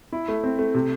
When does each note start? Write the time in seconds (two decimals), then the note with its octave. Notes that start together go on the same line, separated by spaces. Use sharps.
0.13 E4
0.28 A3
0.44 C4
0.59 A3
0.74 C3